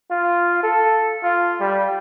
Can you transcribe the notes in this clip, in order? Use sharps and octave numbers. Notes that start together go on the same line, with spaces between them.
F4
A4
F4
G3